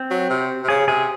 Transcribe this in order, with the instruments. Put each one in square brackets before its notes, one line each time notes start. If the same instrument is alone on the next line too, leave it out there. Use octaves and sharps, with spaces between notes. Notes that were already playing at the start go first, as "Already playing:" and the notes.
Already playing: [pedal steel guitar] C4
[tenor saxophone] F#3
C3
C3
[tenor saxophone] C#3 [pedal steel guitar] G#4
[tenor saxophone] C3 [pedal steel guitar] G#4